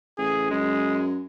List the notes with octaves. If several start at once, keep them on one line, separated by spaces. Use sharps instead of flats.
A1 G#4
F#2 G#3